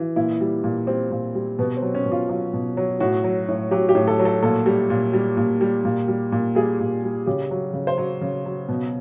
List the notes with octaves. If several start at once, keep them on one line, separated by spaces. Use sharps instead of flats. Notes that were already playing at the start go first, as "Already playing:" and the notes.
Already playing: E3
A#2 E4
G3
A#2
G3 C4
A#2
G3
B2 B3
C4
F#3
C#4
B2
F4
F#3 F4
B2
F#3
A2 F#4
F#3
A2
F#3 G4
G4
A2
A4
F#3
A4
A#2 A4
G3
A#2
G3
A#2
G3
A#2
G3
A#2
G3 G#4
A#2
G3
C#3 G4
F#3
C#3
C5
F#3 C#5
C#3
F#3
B2